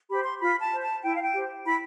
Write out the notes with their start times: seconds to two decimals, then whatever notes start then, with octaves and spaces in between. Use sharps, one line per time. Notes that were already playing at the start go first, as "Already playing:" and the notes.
0.09 G4 C5 B5
0.25 C6
0.40 F4 B5
0.61 A5
0.71 C5
0.82 A5
1.02 E4 G5
1.15 F5
1.22 G5
1.33 G4 C5
1.65 E4 B5